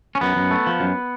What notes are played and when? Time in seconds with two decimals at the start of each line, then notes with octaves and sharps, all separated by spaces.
0.15 C#4
0.21 F#2 B3
0.36 F#2
0.51 A3
0.67 F3
0.80 F#2